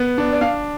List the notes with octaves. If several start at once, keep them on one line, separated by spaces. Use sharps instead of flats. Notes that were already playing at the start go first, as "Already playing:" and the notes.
Already playing: B3
D4
D5
D4 F5